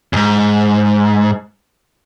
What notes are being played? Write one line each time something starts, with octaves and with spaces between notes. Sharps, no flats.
E2 G#2